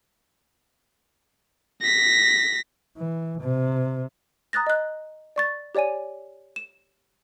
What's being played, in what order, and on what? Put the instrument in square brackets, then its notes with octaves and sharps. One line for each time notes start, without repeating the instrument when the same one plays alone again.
[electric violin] A#6 B6
[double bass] E3
C3
[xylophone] A#5 D#6 F#6 A6 A#6
D#5 F#6
D5 C#6 A6
G4 C#5 D5 G#5 D#7
E7